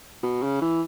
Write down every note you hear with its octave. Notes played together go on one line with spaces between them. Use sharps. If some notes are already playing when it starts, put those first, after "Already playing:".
B2
C#3
E3